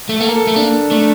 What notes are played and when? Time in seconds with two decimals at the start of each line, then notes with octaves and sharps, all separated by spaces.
0.09 A3
0.20 A#3 A4
0.28 A#4
0.36 A4
0.47 A3
0.56 A#3 D4
0.91 A3 D4